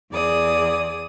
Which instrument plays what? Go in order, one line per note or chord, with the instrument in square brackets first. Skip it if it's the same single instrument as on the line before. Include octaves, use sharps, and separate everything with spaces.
[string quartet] E2 G#4 D5 D#6